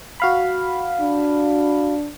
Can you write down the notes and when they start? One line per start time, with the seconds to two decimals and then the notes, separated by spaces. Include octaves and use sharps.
0.20 F#4 F5 B5
1.01 D4